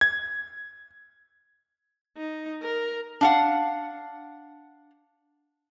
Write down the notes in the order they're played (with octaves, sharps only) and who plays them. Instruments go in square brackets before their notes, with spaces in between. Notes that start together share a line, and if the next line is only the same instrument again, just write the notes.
[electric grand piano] G#6
[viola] D#4
A#4
[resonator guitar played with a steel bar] D4 F5 F#5